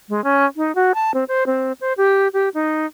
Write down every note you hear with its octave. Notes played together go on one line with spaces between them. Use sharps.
G#3
C#4
D#4
F#4
A5
C4
C5
C4
C5
G4
G4
D#4